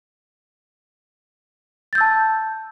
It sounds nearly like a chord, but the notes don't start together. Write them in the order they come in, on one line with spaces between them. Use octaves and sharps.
A6 G6 E6 A5